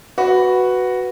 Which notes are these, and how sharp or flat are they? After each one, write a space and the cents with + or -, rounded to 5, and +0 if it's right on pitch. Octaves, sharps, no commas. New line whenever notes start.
F#4 +0 B4 +0